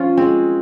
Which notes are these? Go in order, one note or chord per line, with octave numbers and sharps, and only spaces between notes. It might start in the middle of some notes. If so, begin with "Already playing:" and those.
Already playing: F3 C#4 F4
G#3 C4